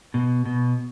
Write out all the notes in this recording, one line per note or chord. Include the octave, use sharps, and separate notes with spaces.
B2
B2